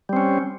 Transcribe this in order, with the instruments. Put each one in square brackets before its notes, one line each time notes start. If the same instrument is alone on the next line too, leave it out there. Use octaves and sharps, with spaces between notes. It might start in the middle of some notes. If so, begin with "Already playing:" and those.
[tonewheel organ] G3
C4
C#4